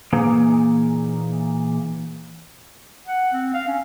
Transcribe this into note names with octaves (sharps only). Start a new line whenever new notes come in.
A#2 E3 A#3 D#4 G#4
F#5
C4
F5
C#4